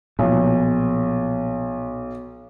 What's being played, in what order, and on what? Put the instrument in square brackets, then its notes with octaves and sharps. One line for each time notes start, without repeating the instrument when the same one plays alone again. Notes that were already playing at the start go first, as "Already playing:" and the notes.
[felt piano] B1 [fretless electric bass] A#2 F3